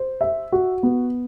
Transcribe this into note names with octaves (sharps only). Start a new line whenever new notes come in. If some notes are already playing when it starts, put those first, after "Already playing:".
Already playing: C5
E5
F#4
B3